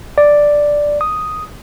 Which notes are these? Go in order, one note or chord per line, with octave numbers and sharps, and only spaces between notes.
D5
D#6